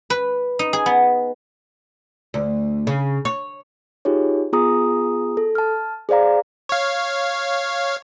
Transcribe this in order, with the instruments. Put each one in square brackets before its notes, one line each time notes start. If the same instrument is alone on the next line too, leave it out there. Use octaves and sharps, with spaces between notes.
[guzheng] B4
D#4
G#4
B3
[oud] D2
C#3
C#5
[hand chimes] D#4 F4 G4 G#4 C#5
B3 F4 G#4 A#5 D#6
A4
A5 F6
G#4 C5 D5 F5 A#5
[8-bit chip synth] C#5 F5